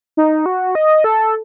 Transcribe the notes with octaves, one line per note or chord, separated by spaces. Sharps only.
D#4
F#4
D#5
A4